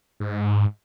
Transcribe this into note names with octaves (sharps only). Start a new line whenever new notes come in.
G#2